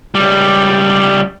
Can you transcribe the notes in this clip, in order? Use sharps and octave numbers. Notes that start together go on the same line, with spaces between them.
C#2 G3